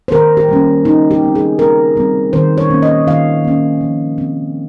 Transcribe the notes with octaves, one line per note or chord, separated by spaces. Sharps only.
C5
D#3 A#4
G4
G3 A#3 C#4
C#3 D#4
G4
G3 C4
G#4
C#3 A#4
G3 C4
D#3 C5
C#5
A#3 C#4
D#5
D#3 F5
A#3 C#4
F3
C4